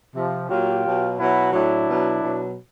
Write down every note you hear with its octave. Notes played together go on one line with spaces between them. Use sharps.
C3 F3
A#2 F#3 F4 G4
B2 F#3
B2 F#3 E4 F#4
A2 F#3 D4 E4
B2 F#3
B2 F#3